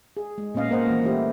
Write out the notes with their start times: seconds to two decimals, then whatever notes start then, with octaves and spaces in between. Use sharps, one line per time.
0.17 G#4
0.38 G#3
0.54 A#2 B3 C#4 D#5 F5
0.70 A#3 A#4 C5 D#5 F#5
0.86 E3 A#3
1.03 E3 G3 A3 E4 G4 C5